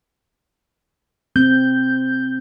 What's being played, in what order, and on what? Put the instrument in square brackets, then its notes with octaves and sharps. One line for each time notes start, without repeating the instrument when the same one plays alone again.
[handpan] C4 [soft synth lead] G6